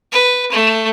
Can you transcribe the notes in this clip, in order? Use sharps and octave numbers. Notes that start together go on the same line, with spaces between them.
B4
A3